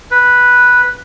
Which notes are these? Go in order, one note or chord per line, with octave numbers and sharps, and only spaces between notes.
B4